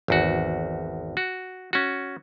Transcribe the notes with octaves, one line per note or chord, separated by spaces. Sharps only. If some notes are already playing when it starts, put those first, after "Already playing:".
G#1 E2 F#4
F#4
C#4 F#4